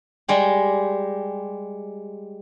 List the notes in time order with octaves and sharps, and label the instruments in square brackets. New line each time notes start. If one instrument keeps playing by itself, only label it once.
[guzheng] G3 G#3 G4